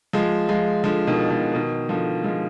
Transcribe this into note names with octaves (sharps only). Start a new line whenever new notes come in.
F3 G#3
F3 G#3
D3 F3
B2 D#3
B2
B2 D#3
D3 F3
F3 G#3